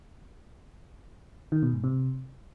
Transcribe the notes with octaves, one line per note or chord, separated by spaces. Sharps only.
D#3
B2
G#2
C3